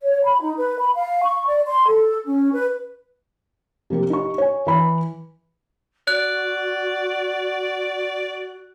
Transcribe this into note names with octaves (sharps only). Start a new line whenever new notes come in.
C#5
B5
D#4
B4
B5
F5
C#6
D5
C6
A4
C#4
B4
C3 F3 A#3 G4
D#4 G4 C#6
C#5 G#5
E3 B5
F#4 D5 F#6